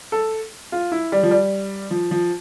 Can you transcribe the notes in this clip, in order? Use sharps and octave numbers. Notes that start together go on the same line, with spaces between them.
A4
F4
E4
G3
F3
G3
F3
F3